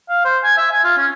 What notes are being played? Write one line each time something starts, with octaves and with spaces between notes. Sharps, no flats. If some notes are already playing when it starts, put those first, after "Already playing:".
F5
C5
G#5
E5
G#5
F4
C#4